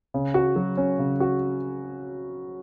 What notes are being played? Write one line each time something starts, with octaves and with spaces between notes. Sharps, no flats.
C#3
F#4
F#3
C#4
C#3
F#4